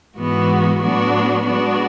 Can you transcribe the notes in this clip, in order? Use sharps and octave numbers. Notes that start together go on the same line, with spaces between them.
G#2 E3 G#3 B3 F#4
A2 F#3 B3 D4 F#4
G#3 B3 D4 F#4